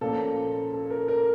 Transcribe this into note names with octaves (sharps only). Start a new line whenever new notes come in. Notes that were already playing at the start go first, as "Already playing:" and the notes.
A#2 F3 A#3 C#4 A4
A4
A#4
A#4